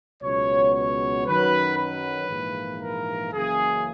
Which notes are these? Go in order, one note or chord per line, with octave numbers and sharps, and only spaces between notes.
C#2 B2 F#3 B3 C#5
C#5
F#2 D#3 F#3 B4
B4
A#1 G#2 E3 A#3
A#4
F#1 F#2 C#3 E3 A#3 G#4